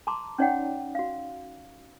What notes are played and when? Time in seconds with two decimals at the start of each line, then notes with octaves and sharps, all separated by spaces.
0.07 A5 A#5 C6 D6
0.38 C#4 D#4 C#5 D5 F#5 G5
0.95 F#4 F5